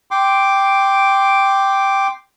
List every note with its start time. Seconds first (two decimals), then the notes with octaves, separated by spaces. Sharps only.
0.11 G5 C6 D6